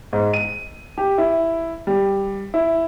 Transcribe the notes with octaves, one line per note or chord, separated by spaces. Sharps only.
G#2
D#7
G4
E4
G3
E4